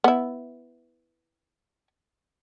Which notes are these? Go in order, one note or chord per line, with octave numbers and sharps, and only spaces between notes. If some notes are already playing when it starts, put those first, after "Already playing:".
B3 E4